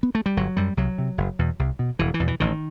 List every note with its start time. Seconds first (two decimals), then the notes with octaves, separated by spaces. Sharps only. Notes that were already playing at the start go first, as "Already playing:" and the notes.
0.03 B3
0.15 A3
0.26 G3
0.37 G1 F#3
0.57 F#2 G3
0.77 C2 F#3
0.98 C3
1.18 F#1
1.39 E2 B2
1.59 C2
1.79 B2
1.99 E1 E3
2.14 E3
2.20 E2 B2
2.28 E3
2.40 A1 D#3